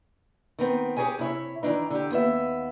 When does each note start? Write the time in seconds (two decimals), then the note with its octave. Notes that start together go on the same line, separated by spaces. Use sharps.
0.59 D#3 B3 C4
0.97 G4 G#4 A#4 C#5 G#5
1.19 C3 E4 C#5
1.63 D#3 E3 D4 D#4
1.90 D3 G4
2.11 D#2 B3 E5